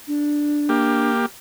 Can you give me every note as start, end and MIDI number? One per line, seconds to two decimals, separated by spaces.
0.08 1.11 62
0.69 1.26 58
0.69 1.26 67